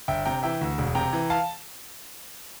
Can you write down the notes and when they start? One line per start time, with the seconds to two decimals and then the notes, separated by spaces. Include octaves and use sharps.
0.08 G1 E5 G5
0.25 C3 G5 A#5
0.43 E3 E5 G5
0.61 D2
0.78 E1
0.95 C3 G5 A#5
1.13 E3
1.30 F5 A5